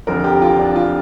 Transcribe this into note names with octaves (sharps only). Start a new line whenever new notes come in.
F1 F2 D3 A#4
G4
F4
D4
F4